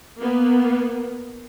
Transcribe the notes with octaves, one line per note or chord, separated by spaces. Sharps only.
A#3 B3